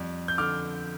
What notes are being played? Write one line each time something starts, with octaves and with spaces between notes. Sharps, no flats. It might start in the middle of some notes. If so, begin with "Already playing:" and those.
Already playing: F2 G3
G6
D3 D6 F6